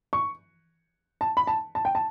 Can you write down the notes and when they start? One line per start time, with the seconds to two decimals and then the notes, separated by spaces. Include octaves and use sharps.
0.13 C#6
1.21 A5
1.37 B5
1.47 A5
1.75 A5
1.85 G5
1.95 A5